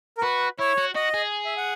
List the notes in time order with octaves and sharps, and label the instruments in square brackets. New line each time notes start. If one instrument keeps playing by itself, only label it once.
[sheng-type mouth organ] A#4
[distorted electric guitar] F#4 [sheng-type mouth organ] B4
[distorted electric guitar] E4 [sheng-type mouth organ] C#5
[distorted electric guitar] F#4
[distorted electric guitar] F#4 [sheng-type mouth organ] D#5
[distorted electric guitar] G#4
[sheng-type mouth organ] E5
F#5